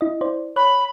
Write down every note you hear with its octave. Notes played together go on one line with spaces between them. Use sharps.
E4 D#5
E4 C5 D5
C#5 B5 F#6